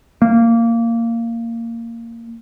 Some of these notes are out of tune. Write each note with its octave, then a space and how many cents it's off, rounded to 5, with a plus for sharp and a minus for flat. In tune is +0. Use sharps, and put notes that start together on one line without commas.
A#3 -15